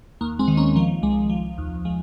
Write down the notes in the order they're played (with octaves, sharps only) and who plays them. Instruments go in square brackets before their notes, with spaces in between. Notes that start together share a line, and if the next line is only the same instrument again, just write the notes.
[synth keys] D#2 A#3
G#3 C4
D#3
A#3 C#4
F3 A#3
C2 G#3
F3
D#2
F3 G#3